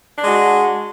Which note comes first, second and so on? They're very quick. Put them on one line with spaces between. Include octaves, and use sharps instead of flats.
D4 G#3 F#4